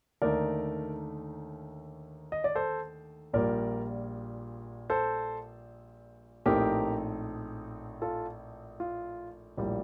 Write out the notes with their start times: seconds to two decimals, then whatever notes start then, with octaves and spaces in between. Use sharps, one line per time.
0.22 D#2 D3 A3 D#4 A#4 D5
2.32 D#5
2.44 D5
2.55 A4 C5
3.33 A#1 A#2 G3 A#4 D5
4.90 A4 C5
6.46 A#1 A2 A3 C4 D#4 G4 A#4
8.02 F4 A4
8.80 F4
9.57 A#1 A2 G3 A#3